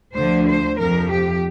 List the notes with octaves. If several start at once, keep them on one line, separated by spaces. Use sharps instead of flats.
D2 D3 F3 C5
C5
F2 C3 F3 A#4
G4